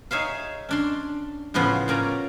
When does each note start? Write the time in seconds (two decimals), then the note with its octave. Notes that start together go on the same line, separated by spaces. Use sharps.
0.11 D#4 G#4 C#5 E5 F5
0.69 C#4 D4 C6
1.54 A2 C#3 F3 B3 C#4
1.88 A#2 C#4 D5 A#5